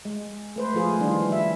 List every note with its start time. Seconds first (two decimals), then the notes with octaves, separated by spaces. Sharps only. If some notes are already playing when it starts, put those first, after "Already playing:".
0.05 G#3
0.56 A3 B4 C5
0.74 F3 A3 F4 G#4
0.99 D#3 E3 G3 D4 F4
1.32 E4 E5